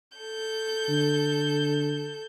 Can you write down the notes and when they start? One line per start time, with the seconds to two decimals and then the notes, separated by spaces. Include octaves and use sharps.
0.18 A4 G6
0.89 D3